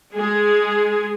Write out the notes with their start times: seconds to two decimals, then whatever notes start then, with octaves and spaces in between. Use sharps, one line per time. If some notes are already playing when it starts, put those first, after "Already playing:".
0.15 G#3 G#4